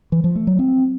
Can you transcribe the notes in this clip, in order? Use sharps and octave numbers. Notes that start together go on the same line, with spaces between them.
E3
F3
A3
F#3
C4